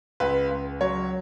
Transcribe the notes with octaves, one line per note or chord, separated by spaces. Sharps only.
C#2 B4
C#2
F#3 C#5